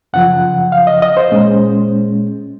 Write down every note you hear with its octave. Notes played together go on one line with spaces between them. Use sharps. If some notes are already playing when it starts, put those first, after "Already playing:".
F#2 C#3 F3 F#5
F5
D#5
D#5
C5
A#2 G#3 C#4